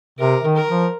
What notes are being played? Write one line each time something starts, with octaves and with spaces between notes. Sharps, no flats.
C3 A#4
D#3
A#4
F3